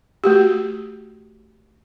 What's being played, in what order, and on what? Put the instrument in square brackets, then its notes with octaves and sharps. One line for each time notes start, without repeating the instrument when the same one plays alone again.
[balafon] A3 F#4 G4